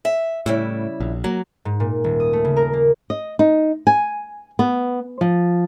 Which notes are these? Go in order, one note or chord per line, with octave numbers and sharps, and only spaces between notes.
E5
A2 C#3 G3 E4
A#1
F#3 A#3
G#2
A#2
D#1
D#6
A3
C#3
A#4
A#3
D#5
D#4
G#5
B3
F3